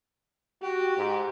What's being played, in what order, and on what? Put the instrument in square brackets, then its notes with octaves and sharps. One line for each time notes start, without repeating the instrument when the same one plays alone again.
[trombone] F#4 [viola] G4
[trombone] G#2